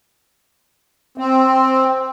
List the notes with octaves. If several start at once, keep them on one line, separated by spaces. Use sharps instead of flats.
C4